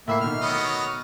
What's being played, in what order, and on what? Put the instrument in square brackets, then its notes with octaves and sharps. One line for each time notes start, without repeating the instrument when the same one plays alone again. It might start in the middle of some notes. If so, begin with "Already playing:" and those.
[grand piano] A2 B5 C7 [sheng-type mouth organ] A#3 E5
[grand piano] B2 D#3 [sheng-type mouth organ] F6
[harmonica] F#3 B3 D#5